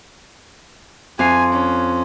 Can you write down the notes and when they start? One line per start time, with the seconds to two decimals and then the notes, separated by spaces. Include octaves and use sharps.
1.19 F2 F5 G#5
1.53 C#4